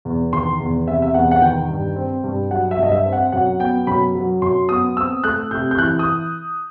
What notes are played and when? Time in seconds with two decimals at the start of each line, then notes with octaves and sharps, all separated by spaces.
0.05 E2
0.33 D#3 C6
0.60 E2
0.87 C3 E5
1.02 E5
1.14 E2 F#5
1.31 F#5
1.42 D#3 G5
1.69 G2
1.96 C4
2.24 G2
2.50 F#3 F#5
2.71 E5
2.78 G2 D#5
2.92 E5
3.06 C4
3.13 F#5
3.32 F#2 F#5
3.60 B3 G5
3.87 F#2 B5
4.15 F#3
4.42 F#2 C6
4.69 B3 D#6
4.96 C4 E6
5.24 A3 F#6
5.51 C3 G6
5.71 G6
5.78 E3 F#6
5.99 D#6